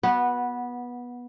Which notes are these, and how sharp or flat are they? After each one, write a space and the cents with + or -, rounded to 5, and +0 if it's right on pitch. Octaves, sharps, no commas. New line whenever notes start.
B3 -15 F#4 +0